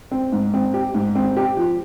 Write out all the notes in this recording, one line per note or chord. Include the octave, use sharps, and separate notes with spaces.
C4
G#2
C4
G4
G#2
C4
G4
F3